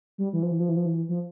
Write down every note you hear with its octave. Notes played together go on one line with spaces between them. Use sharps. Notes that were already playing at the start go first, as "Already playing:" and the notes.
G3
E3
F3
E3
F3
E3
F3
E3
F3